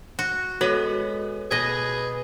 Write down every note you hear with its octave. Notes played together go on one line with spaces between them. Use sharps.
F#4
G#3 B3 F#4 A4 C#5
B2 G#4 B4 D#5